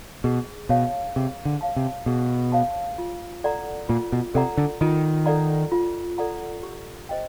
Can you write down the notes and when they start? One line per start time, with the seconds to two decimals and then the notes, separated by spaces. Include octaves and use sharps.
0.24 B2 G#4
0.69 B2 C#5 F5 A5
1.16 C3 G#4
1.45 D3
1.61 C#5 F5 A5
1.76 C3
2.06 B2 G#4
2.52 C#5 F5 A5
2.98 F4
3.44 A4 D5 F#5 A#5
3.89 A#2 F4
4.12 B2
4.34 C3 A4 D5 F#5 A#5
4.57 D3
4.81 D#3 F4
5.26 A4 D5 F#5 A#5
5.72 F4
6.18 A4 D5 F#5 A#5
6.63 G4
7.09 C5 D#5 G5